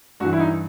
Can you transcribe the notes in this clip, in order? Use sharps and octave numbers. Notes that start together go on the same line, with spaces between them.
G2 E3 F#4
E4
D#4